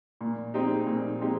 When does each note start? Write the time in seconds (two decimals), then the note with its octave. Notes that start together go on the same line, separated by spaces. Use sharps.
0.21 A#2
0.54 G#3 C4 D#4 G4
0.87 A#2
1.20 G#3 C4 D#4 G4